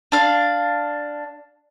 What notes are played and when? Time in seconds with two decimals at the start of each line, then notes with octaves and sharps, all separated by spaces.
0.12 D4 F5